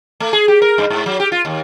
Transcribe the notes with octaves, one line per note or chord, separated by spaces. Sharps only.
A3
G#4
G4
A#4
G2
G#2
F#3
G4
F4
D#2